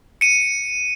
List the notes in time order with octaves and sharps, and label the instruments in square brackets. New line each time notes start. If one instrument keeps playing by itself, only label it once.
[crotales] C#7 D#7